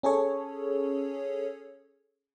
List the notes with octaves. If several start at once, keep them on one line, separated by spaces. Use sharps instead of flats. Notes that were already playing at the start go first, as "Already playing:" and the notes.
C#4 G#4 A4 C#5